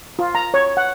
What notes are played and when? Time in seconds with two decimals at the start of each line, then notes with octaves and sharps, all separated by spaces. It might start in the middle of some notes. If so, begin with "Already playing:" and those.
0.19 F4
0.35 A#5
0.54 C#5
0.77 F#5